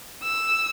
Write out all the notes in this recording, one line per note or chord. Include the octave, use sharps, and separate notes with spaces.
E6